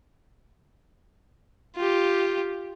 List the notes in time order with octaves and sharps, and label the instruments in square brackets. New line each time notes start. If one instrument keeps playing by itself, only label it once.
[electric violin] F4 G4